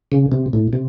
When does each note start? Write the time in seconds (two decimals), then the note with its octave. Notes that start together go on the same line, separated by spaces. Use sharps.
0.12 C#3
0.32 C3
0.53 A2
0.73 C3